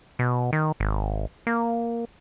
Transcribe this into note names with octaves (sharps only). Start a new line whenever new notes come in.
B2
D#3
G#1
A#3